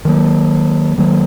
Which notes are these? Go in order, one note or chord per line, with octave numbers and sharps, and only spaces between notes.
D#3 F#3 A#3
D#3 F#3 A#3